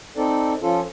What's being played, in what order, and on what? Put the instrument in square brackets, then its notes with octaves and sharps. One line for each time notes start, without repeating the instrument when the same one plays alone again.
[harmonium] C4 D#4 A4 D5
F3 C#4 F4 A4